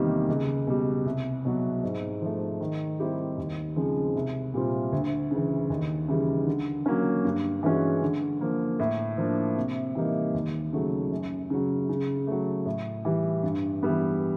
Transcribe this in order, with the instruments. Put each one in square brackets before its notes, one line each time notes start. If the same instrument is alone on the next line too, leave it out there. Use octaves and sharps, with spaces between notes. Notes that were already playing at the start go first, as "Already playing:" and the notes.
Already playing: [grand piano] E2 C3 D#3 G3 A#3
C#2
B2 G3
C2
B2 F#3
G#2
F3 A3
D#3
G3 C4 E4 G4
D#2
C#3 F3 G#3 C4
C2
A#2 G3 C4 F4
D2
C#3 E3
D#2
C#3 E3 G3
D3
F#3 A#3 C#4
G2
E3 G#3 C#4 F#4
D3
F3 A#3
A2
F3 A#3 D4
C3
E3 G3 A#3 D#4
D#2
C#3 F#3 A3
F#2
C#3 F#3
C#3
F#3 A3
A2
E3 G3
G2
E3 G3 B3